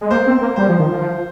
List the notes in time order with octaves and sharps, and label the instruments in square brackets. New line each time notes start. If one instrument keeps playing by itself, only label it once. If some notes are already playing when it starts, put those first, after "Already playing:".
[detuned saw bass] G#3
[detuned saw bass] A#3 [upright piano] C5
[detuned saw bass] C4
A#3
[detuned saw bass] G3 [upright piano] C5
[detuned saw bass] F3
D#3
F3